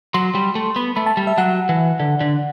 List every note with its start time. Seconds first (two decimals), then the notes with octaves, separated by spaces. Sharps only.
0.14 F#3 C6
0.35 G3
0.55 A3
0.76 B3 B5
0.96 A3 B5
1.06 A5
1.17 G3
1.27 E5
1.38 F#3 F#5
1.69 E3
2.00 D3
2.21 D3